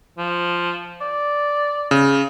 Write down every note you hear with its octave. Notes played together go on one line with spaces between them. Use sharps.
F3
D5
C#3